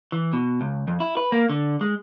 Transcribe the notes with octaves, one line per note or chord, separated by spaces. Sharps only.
E3
B2
C#2
F2
E4
B4
A#3
D3
G#3